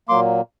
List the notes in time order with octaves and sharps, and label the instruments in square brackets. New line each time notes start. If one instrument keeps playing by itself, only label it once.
[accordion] A#2 F#3 A#3 C6 D6